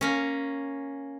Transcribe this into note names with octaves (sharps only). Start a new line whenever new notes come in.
A#3 C#4